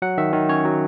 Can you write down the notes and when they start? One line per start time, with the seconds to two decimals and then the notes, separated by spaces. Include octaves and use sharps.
0.02 F#3 F#5
0.18 D#3 E5
0.33 D#3
0.49 C#4 C#5
0.64 F#3